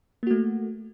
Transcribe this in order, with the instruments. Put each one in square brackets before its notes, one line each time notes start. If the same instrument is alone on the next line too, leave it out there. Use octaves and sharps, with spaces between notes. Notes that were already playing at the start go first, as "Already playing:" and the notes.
[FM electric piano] A#3
F#4
A3